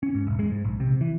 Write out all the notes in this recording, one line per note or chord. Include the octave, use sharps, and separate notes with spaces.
C#4
G#2
E1
G#3
G#2
A#1
C3
E3